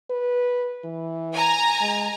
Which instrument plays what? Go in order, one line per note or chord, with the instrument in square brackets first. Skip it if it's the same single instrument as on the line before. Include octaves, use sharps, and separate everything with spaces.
[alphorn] B4
E3
[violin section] G#5 A#5
[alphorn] G#3